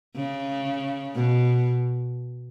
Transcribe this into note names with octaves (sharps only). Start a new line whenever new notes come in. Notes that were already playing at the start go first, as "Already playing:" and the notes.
C#3
B2